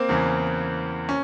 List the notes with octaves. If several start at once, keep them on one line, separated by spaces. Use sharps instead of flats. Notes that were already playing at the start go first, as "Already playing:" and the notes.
Already playing: A#3 C4
E2 C#3 E3
C#4